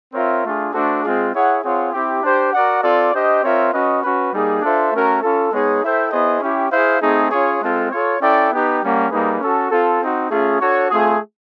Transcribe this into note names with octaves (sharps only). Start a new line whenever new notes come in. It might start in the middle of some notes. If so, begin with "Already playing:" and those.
C4 F4 A#4 C#5 E5
A3 D4 F4 G#4
A3 D4 F#4 A4 C5
G#3 C4 F4 G#4
E4 G#4 C#5 F#5
C4 F4 G#4 C#5 F#5
C4 E4 G4
D4 G4 C5
F#4 A#4 D5 F#5
C4 F4 A4 D5
D4 G4 C5 D#5
C4 F4 A#4 C#5 E5
C#4 F#4 B4 D#5
C#4 F#4 B4
G3 A#3 D#4 G#4
D4 F4 A4 C5 E5
A3 C#4 F#4 A#4
C#4 F4 A4
G#3 B3 D#4 G#4 C#5
E4 A4 C5 E5 G5
B3 E4 G#4 C5 D#5
C#4 E4 G4
E4 G#4 C5 F5
A3 C4 D#4 G#4
C#4 F4 G#4 C#5
G#3 C4 F4 A4
F4 A4 C#5
C#4 E4 A4 D5 G5
B3 D#4 G4 B4
G3 A#3 C#4 F#4
G3 A#3 D#4 G#4 B4
C#4 F#4 A4
C4 F4 A4
C4 D#4 F#4
A3 C#4 F4 G#4
D4 F#4 A4 C#5
A3 C4 F4 G#4